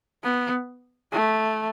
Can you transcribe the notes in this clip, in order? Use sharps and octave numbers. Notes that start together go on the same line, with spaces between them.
B3
A3